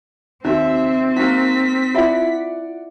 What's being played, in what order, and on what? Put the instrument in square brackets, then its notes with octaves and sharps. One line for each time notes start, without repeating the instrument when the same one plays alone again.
[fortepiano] D#2 [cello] C4 [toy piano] D#4 F#4 [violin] E5
[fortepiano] F#3 A#3 [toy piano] D#4 [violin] B6
[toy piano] E4 F4 E5 [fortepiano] D5 F#5